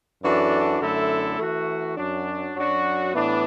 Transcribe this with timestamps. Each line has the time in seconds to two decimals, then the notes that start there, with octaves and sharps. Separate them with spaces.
0.22 F#2 E3 D4 F#4 A4
0.80 F#2 D3 A3 E4 A4
1.39 E3 A3 F#4
1.97 F#2 F#3 D4
2.56 F#2 F#3 D4 F#4
3.14 A2 E3 B3 D4